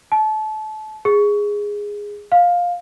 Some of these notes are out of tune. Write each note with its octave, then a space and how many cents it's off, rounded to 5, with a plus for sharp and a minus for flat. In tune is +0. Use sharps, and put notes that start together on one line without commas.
A5 -30
G#4 -10
F5 +10